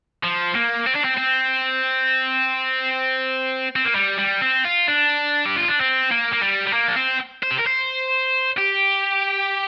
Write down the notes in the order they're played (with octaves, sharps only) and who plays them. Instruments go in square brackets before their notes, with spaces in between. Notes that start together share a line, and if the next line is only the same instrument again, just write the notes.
[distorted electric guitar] F3
A#3
C4
D4
C4
C4
C4
A#3
G3
G3
C4
F4
D4
G4
F4
D4
C4
A#3
A#3
G3
G3
A#3
D4
C4
C5
G4
A#4
C5
G4